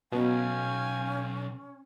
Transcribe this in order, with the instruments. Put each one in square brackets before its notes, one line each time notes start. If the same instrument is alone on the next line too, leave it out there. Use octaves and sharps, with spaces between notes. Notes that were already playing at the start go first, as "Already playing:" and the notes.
[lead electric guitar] B1 [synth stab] B2 [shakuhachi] C#4 [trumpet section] F5 G5 G#5